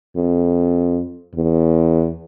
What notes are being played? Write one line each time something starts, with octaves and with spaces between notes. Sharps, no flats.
F2
E2